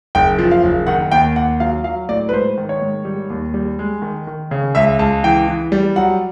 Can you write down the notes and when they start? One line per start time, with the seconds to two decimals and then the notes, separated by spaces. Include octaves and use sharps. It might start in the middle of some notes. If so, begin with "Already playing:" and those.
0.15 F#1 G5
0.39 F3
0.51 F5
0.63 F#1
0.87 D#3 F#5
1.12 D#2 G5
1.36 D#2 F#5
1.60 F#3 F5
1.84 F#3 F5
2.09 A2 D5
2.29 B4
2.33 G#2 C5
2.58 D#3
2.69 C#5
2.82 G#2
3.05 G3
3.30 D#2
3.54 G3
3.79 G#3
4.02 D#3
4.27 D#3
4.51 C#3
4.75 C#2 E5
4.99 C#2 A5
5.23 E3 G5
5.48 E3
5.72 G3
5.96 F#3 F#5